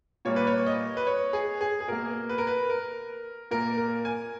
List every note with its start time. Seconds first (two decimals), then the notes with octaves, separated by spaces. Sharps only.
0.25 A#2 G3 A#3 C#5
0.36 B4
0.47 C#5
0.66 D#5
0.97 B4
1.07 C#5
1.33 G#4
1.61 G#4
1.80 G#4
1.87 B2 A#3 A#4
2.29 B4
2.38 A#4
2.47 B4
2.70 A#4
3.51 A#2 A#3 A#4
3.78 A#4
4.05 G#5